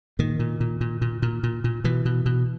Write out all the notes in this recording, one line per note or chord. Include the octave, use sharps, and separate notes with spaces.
A#2 D#3
A#2
A#2
A#2
A#2
A#2
A#2
A#2
B2 E3
B2
B2